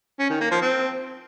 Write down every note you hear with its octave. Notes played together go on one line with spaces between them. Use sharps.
C#4
D#3
A#3
F3
C4